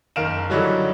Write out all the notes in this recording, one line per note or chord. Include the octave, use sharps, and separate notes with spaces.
F#1 D#3 A#4 F5 D7 E7
D3 E3 F#3 G3 D#4 F#4